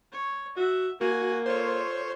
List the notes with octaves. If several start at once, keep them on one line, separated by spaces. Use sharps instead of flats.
C#5
F#4 E5
A#3 F#4 G#5
F4 A4 C5 C#5